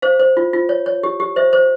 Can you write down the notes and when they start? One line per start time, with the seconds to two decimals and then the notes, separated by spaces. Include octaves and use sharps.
0.02 C5 F5
0.20 C5
0.37 F4
0.53 F4
0.69 C#5
0.86 C#5
1.03 G4
1.20 G4
1.36 C5 E5
1.53 C5